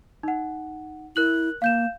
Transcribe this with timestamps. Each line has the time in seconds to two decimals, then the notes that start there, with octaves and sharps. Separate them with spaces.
0.23 D#4 F#5
1.16 E4 A#4 F#6 F#7
1.62 A#3 F5 G6 E7